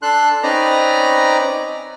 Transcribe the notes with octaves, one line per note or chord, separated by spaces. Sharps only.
D4 A4 C6 F#6
C4 C#4 D#4 B4 D5 A#5